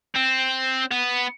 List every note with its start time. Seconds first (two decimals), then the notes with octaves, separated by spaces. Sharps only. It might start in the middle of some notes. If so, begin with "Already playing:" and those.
0.16 C4
0.91 B3